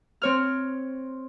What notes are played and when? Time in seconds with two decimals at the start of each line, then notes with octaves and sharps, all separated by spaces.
0.22 C4 C#5 F6